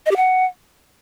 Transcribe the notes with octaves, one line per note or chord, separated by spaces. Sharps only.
D#5
G4
F#5